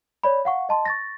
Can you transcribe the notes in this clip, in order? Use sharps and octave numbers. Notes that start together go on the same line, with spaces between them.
C#5 D5 B5
F5 F#5 C#6
D#5 A5 C6
C#6 A6 A#6